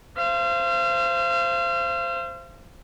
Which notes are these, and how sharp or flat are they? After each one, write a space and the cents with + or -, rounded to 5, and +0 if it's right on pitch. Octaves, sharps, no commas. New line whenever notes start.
C5 +0 F5 -35